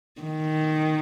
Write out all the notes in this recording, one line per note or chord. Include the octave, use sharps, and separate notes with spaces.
D#3